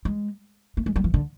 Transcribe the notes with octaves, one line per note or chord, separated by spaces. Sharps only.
G#3
A3
G#3
G3
E3
D3